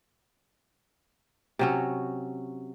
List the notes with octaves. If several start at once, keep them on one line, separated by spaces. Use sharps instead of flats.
C3 F#3 C#4